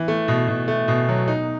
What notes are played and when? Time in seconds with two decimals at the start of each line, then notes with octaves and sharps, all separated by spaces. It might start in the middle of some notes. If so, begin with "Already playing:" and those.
Already playing: E3
0.08 A3
0.28 B2
0.48 B2
0.68 A3
0.88 B2
1.09 F#3
1.28 D#4